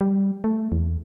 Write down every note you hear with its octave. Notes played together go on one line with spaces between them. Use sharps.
G3
A3
E2